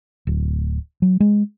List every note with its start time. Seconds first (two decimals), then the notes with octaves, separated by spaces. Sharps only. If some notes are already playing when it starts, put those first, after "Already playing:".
0.27 D1
1.02 F#3
1.20 G#3